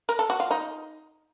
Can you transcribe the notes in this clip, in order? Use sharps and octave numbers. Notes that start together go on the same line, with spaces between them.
A#4
A4
F#4
F4
D#4